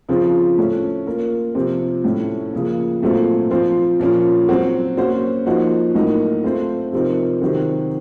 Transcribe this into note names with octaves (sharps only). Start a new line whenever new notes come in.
C#3 F3 C4 F4
A2 A3 C#4
A#3 F4 A#4
C3 F3 C4
A2 A3 C#4
C#3 F3 A#3
A#2 F#3 A3 C4 F4
F3 C4 F4 C5
A#2 F3 A#3 C#4 F4
F#3 C4 F#4
A#3 C#4 F#4 C5
F3 A#3 D#4 F#4 C5
A2 F#3 A#3 D#4 A#4
A3 C4 F4 C5
C3 F3 C4 D#4 A#4
C3 D#3 F#3 C4